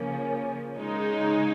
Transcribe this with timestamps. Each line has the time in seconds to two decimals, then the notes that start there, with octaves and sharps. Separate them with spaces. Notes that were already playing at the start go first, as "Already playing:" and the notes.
Already playing: C#3 F3 A#3 C#4
0.76 C#3 G#3 D#4